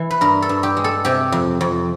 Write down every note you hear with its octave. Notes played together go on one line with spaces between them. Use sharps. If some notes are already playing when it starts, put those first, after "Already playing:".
Already playing: E3
B4
G2 A#4
A4
G2
G4
G#3
A4
C3 G4
F2
F2